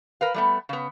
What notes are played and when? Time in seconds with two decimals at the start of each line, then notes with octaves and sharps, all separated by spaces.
0.21 A#4 B4 F5
0.34 G3 A3 B3
0.69 C#3 B3